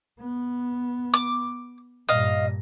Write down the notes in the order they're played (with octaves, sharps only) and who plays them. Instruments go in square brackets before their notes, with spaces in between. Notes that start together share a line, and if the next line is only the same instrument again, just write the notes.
[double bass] B3
[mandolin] D6
[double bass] G2 A#2 [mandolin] D#5 F5